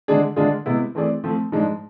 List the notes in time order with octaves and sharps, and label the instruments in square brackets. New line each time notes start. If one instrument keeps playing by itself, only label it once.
[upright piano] D3 G#3 D4 G#4
D3 G#3 D4 F4 G#4
C3 G#3 B3 E4
E3 A3 C4 G#4 D5
F3 A3 C4
G#2 F3 G#3 D4